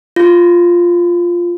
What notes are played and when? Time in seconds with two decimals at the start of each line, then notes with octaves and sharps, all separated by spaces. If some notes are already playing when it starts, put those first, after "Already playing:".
0.16 F4